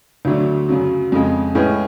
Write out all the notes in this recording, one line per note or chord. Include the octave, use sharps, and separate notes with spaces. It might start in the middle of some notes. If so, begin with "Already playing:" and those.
D2 D3 F#3 A3 D4
F#2 C#3 F#3
F2 C#3 G#3
A2 G#3 C#4 G#4 B4